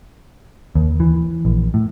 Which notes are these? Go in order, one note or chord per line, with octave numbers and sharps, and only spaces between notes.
D#2
E3
A#1
A2